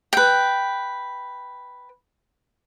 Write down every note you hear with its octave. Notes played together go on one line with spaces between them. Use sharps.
B4 G5